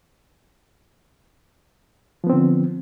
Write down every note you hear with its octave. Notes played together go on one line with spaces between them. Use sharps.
D3 F3 B3 C4